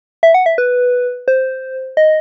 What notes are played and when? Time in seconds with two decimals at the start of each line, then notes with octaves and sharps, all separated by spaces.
0.23 E5
0.34 F#5
0.46 E5
0.58 B4
1.28 C5
1.97 D#5